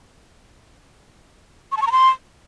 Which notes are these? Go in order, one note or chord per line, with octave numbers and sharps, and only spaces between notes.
C#6
A5
C#6
A#5
C6